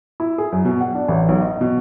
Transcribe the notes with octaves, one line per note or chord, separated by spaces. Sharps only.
E4
G#4
F#2
B2
F#5
D4
A1
B1
D#5
B2